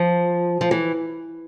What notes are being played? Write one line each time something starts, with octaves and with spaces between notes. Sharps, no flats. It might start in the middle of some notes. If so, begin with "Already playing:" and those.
Already playing: F3
F3
E3